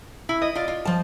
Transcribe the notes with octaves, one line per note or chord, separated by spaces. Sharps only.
E4
D#5
F4 D5
F4
F3 A5